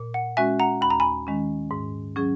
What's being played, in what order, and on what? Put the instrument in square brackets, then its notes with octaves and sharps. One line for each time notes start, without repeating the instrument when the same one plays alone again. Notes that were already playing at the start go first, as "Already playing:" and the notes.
Already playing: [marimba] A#2
[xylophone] F#5
[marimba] G#3 C#4 F#4 [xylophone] E5 G#5
[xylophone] F#5 A#5
[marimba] D#2 [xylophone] B5
[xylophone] A#5
G#5 B5
[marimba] D#3 G#3 C#4
G#2
F#3 C#4 G#4